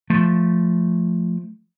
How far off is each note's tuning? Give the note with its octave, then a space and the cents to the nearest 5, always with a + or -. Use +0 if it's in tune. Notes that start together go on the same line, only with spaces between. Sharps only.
F3 +0 A3 +0